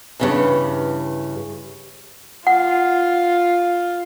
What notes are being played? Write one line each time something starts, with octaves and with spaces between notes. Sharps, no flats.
G2 C#3 E3
F4 F#5